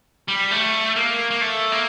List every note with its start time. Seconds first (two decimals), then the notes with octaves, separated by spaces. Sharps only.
0.28 G3
0.51 A3
0.96 A#3
1.30 A#3
1.41 A3
1.72 A#3